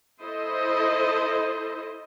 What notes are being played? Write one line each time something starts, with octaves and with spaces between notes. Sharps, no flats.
E4 A4 C5 D#5